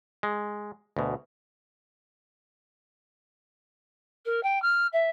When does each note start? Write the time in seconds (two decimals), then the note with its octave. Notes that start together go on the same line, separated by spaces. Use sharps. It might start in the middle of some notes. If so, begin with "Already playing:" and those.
0.23 G#3
0.97 D2 B2
4.25 A#4
4.43 G5
4.62 F6
4.93 E5